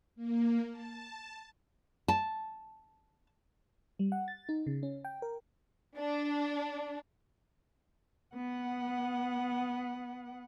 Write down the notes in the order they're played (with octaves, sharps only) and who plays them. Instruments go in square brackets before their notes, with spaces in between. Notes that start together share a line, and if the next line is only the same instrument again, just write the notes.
[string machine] A#3
A5
[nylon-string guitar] A5
[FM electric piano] G3
F#5
A6
D#4
C#3
C#4
G5
A#4
[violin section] D4
[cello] B3 F#5